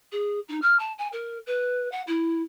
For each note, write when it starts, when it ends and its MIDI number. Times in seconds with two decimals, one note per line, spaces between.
0.11 0.39 68
0.48 0.58 63
0.61 0.76 89
0.79 0.92 81
0.98 1.07 80
1.12 1.38 70
1.46 1.90 71
1.91 2.01 78
2.07 2.41 64